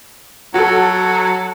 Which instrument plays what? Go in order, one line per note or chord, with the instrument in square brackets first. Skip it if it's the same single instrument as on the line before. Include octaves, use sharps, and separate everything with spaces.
[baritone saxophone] F#3 [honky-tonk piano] F#4 A4